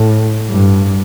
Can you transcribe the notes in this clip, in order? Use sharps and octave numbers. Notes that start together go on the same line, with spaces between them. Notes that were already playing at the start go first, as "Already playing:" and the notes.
Already playing: A2
G2